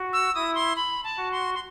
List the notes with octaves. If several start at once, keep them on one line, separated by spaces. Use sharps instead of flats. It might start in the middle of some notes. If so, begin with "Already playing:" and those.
Already playing: F#4
E6
E4 D#6
C6
B5
A5
F#4
C6
C6